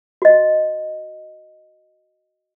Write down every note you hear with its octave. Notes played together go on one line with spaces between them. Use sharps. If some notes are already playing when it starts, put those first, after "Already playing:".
F#4 D#5